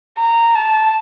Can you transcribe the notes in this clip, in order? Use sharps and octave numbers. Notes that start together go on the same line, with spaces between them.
A#5
A5